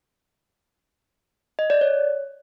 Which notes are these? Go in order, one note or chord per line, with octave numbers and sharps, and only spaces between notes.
D#5
D5
C#5